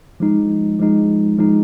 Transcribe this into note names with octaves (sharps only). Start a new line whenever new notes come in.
F3 G#3 D#4
F3 G#3 D#4
F3 G#3 D#4